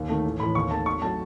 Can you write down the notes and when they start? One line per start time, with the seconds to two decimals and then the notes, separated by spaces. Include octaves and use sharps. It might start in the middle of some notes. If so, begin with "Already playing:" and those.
Already playing: D#2
0.09 D#3 A3
0.24 A1
0.40 A2 E3 B5
0.55 D#2 C#6
0.71 D#3 A3 A5
0.86 G#1 C#6
1.02 F#3 A3 A5